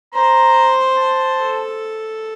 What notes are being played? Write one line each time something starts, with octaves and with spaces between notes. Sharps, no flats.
C5 A#5
A5
A4